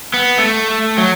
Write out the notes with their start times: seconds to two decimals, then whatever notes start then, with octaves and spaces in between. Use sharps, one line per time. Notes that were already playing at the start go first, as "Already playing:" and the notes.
0.14 B3
0.38 A3
0.98 F#3